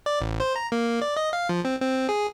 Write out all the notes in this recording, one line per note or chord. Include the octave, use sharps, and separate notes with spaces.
D5
A1
C5
A#5
A#3
D5
D#5
F5
F3
C4
C4
G#4